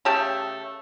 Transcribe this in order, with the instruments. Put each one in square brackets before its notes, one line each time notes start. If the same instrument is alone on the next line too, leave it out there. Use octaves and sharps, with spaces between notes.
[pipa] C#3 A3 G4 A5